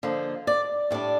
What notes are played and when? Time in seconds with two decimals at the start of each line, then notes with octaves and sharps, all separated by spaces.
0.03 D3 F3 A#3 D#4
0.47 D5
0.90 A2 G3 D4 D5